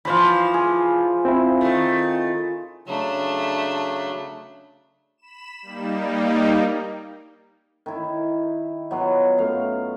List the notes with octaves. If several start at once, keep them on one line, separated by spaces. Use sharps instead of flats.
E3 F3 F4 C5 B5
G#4
C4 E4
D#3 A3
C#3 F#3 A3 D4
B5 E7
G3 A#3 D#4
D#3 E4
F#3 B3 F4
F#2 A3 F5